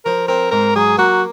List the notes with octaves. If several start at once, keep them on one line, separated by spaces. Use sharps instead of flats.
F3 A#4
C4 A#4
G#2 A#4
F#3 G#4
A#3 F#4